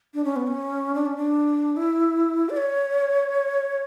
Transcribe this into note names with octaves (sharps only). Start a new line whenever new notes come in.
D4
C#4
B3
C#4
D4
C#4
D4
E4
D5
C#5